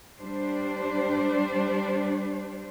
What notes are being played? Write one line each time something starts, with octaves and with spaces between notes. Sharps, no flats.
G3 D4 C5